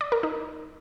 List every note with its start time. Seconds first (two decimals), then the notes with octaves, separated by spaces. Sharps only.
0.01 D5
0.12 A#4
0.23 D#4